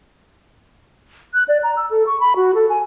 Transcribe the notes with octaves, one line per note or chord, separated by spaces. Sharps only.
F#6
D5
A#5
E6
A4
C#6
B5
F#4
A4
G#5